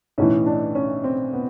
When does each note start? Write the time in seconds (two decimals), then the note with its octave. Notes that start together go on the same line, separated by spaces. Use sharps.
0.18 B1 A2 E3 C#4
0.46 D4
0.75 C#4
1.04 C4
1.33 B3